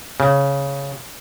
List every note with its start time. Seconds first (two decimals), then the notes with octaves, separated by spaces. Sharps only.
0.20 C#3